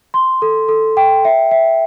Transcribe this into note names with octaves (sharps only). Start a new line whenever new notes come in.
C6
A4
A4
G5
E5
E5